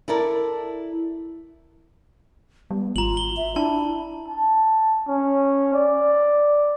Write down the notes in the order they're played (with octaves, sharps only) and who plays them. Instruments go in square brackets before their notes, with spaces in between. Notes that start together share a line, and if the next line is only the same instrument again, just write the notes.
[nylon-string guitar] E4 A4 A#4 D5
[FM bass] G3 [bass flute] B3
[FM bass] G#1 [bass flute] F4 [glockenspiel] A#5 F#7
[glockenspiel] G7
[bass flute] E5
[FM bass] D4 [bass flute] E4 [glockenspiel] A5
[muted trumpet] A5
C#4
D5